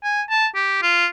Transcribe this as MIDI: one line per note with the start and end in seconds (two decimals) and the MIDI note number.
0.04 0.22 80
0.30 0.47 81
0.55 0.81 67
0.82 1.06 65